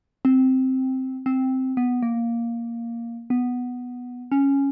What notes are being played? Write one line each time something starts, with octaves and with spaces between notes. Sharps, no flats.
C4
C4
B3
A#3
B3
C#4